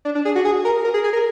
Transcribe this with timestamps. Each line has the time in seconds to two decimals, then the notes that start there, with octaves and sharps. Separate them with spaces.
0.05 D4
0.15 D4
0.25 G#4
0.35 F#4
0.45 G#4
0.65 A#4
0.84 A#4
0.94 G#4
1.04 G#4
1.13 A#4